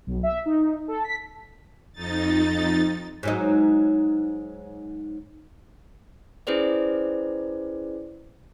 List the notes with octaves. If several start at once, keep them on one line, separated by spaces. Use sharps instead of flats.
B1
E5
D#4
A4
B6
F2 D#4 A6
G#2 F#3 D#4
C#4 E4 G#4 B4 C5 D5